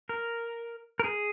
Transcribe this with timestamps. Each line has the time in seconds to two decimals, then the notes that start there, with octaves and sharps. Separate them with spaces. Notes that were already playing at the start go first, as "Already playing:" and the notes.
0.09 A#4
1.00 A#4
1.04 G#4